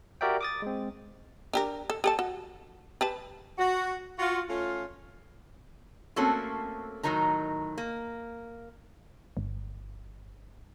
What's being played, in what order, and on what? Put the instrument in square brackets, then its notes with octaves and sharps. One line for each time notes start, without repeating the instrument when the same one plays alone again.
[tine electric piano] F#4 G4 A#4 D5 E5 G5
D6 D#6 A6
G#3 C4
[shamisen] D4 G4 A#4
A4
G4 A4 A5
F#4
G4 B4 A5
[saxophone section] F#4
F4 F#4
A3 C#4 F4
[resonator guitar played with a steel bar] A3 A#3 C4 C#4 F#4 A4
A2 D#3 F#3 D#4 A#4 A#5
A#3
[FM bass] G1